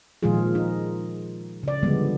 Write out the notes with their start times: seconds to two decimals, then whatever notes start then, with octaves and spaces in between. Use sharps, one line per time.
0.23 A#2 D#3 F3 G#3 F4 G#4
0.55 D#4
1.63 C#3 D5
1.83 D3 F3 G3 G#3 B3